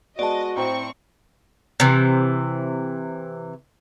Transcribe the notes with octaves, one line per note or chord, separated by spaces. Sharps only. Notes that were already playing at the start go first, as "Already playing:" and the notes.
G#3 B3 F#4 D5 D#5 A5
A2 C4 G5 A#5 C#6
C3 E3